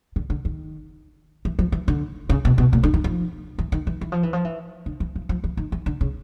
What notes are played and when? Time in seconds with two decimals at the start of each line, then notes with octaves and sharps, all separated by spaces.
0.16 D3
0.30 D3
0.45 D#3
1.45 E3
1.59 F3
1.72 E3
1.88 D3
2.29 C#3
2.45 B2
2.58 B2
2.73 A#2
2.83 D3
2.94 D#3
3.04 F3
3.58 E3
3.72 D#3
3.87 E3
4.01 E3
4.12 F3
4.23 E3
4.33 F3
4.44 E3
4.86 D3
5.00 E3
5.16 F3
5.29 F3
5.44 E3
5.57 D#3
5.72 E3
5.86 D3
6.01 C#3